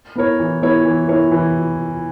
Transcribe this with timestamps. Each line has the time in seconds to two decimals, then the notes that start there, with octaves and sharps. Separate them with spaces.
0.16 B3 E4 A#4 C#5
0.39 E3
0.62 B3 E4 A#4 C#5
0.85 E3
1.08 B3 E4 A#4 C#5
1.31 E3